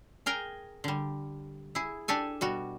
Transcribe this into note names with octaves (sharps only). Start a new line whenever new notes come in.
G#4 A#4 G5 G#5
D3 G3
E4 G#4
D4 G4 A4 G#5
B2 G3 F#4